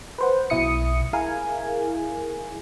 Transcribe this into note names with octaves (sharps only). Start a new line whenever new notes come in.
B4 C5 F#5
B1 B2 E4 D#6 C#7
E4 G#4 A#4 F5 G#5